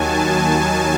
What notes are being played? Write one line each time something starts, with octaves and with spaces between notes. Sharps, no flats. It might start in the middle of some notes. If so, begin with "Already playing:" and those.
Already playing: D#2 D#3 F#3 G#5 A5
G#5